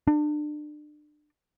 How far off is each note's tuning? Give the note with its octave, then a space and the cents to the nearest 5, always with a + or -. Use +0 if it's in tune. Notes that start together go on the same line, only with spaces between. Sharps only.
D4 +30